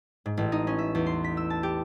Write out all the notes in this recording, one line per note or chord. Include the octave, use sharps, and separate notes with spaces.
G#2
A1
D#4
C#4
E5
E2
C6
B6
E6
A5
G4